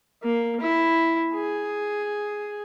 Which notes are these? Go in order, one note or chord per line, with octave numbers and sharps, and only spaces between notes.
A#3
E4
G#4